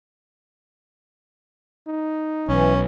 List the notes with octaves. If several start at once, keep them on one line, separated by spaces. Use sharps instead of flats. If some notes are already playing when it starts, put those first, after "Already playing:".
D#4
B1 E3 C#4